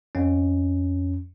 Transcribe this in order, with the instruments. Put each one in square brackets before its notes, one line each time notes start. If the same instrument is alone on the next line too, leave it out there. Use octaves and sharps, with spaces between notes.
[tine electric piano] F2 C#4